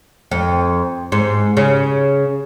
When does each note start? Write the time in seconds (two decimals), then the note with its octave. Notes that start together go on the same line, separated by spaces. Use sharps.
0.31 F2
1.12 G#2
1.57 C#3